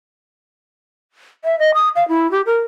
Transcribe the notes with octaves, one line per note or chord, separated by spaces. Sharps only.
E5
D#5
D#6
F5
E4
G4
A#4